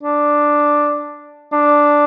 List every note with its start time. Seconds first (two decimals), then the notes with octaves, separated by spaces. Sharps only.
0.04 D4
1.53 D4